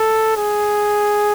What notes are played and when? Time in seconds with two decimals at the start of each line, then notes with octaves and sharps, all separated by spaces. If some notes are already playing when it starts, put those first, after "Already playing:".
Already playing: A4
0.37 G#4